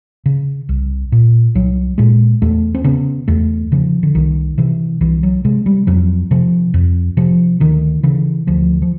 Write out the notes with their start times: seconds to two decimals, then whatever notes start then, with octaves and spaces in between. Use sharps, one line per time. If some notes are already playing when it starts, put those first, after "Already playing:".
0.26 C#3
0.69 C2
1.12 A#2
1.55 C2 F#3
1.98 A#2 G#3
2.42 E2 A3
2.75 C4
2.84 C#3 B3
3.28 E2 A3
3.72 C#3 F3
4.03 D3
4.15 C2 D#3
4.58 C3 E3
5.01 C2 E3
5.23 F#3
5.45 C3 G#3
5.66 G3
5.87 F2 F#3
6.31 C3 F3
6.74 F2
7.17 C3 F3
7.60 D2 D#3
8.03 C#3 E3
8.47 D2 F3
8.82 F3